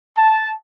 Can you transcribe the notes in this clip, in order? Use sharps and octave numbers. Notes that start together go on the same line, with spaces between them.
A5